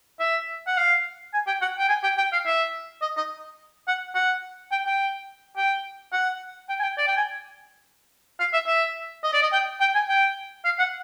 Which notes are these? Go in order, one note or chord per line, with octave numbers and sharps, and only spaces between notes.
E5
F#5
F5
G#5
G5
F#5
G5
G#5
G5
G5
F5
E5
D#5
D#5
F#5
F#5
G5
G5
G5
F#5
G5
G#5
G5
D5
G5
G#5
F5
E5
E5
D#5
D5
D#5
G5
G5
G#5
G5
F5
F#5